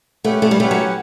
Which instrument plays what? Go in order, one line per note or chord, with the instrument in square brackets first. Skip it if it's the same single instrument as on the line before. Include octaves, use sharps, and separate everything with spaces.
[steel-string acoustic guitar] A3 [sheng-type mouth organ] C#4 G4 B4 F#5
[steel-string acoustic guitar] A3
G3
[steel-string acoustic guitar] A3 [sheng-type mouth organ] C#4 G4 B4 F#5
[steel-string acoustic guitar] F#3